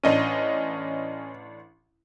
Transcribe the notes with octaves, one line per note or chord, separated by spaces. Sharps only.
A1 C#4 D4 D#5 D#7